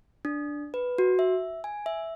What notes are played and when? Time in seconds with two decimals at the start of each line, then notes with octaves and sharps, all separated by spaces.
0.25 D4
0.74 B4
0.98 F#4
1.19 E5
1.64 G#5
1.86 E5